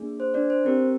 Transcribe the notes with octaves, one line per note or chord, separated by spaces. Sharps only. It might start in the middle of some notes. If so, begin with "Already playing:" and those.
Already playing: A#3 D4 G#4
C5
D4 D5
C5
C4 G4 A#4